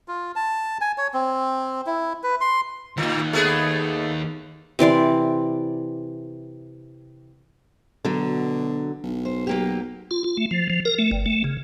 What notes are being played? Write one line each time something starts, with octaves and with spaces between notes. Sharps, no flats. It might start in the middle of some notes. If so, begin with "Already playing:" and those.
F4
A5
G#5
C#5
C4
E4
B4
C6
D#2 A2 D#3
A3 B3 G#4
C3 E3 D5 C6
B2 D3 F#3
B1
C5
F#3 A#3 G4
F4
F4
A3
F3
F3
A#4
A3
G1
A3
C#3